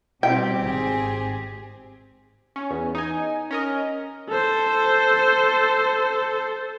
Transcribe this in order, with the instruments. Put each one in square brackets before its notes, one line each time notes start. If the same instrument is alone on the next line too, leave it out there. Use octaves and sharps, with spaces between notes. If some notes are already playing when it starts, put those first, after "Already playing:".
[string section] B2 G3 [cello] C4 G4 [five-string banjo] G5
[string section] G#1 G#4
[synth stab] C#4
E2
D#4 G#5
C#4 A#4 D#5
[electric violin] A4 C5